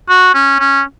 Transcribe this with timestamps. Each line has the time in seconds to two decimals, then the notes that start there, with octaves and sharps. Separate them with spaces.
0.09 F#4
0.34 C#4
0.60 C#4